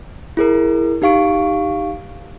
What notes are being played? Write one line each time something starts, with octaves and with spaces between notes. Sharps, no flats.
E4 G#4 A#4
D#4 G4 F5 C#6 D7